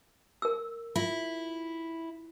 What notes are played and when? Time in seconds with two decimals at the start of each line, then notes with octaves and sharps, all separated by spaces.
0.42 A#4 E6
0.96 E4 F4